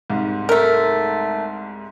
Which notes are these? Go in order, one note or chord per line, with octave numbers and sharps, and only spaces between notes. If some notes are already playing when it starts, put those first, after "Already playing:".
C2 G#2
A3 A#4